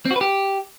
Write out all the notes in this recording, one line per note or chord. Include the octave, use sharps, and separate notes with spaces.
C4
F#4
B4
G4